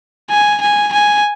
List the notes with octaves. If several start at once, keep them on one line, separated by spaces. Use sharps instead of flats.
G#5
G#5
G#5